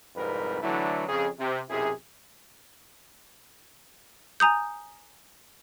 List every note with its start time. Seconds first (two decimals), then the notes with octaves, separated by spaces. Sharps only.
0.15 C2 F2 G#2 G3 A#4 B4
0.62 D3 E3 F#3 A3 D4 E4
1.08 F2 C#3 G#4
1.39 C3
1.70 B1 F#2 C3 E4 G#4
4.40 G#5 A#5 D#6 G6